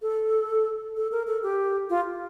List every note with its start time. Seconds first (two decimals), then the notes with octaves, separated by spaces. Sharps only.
0.02 A4
0.96 A4
1.12 A#4
1.27 A4
1.43 G4
1.90 F4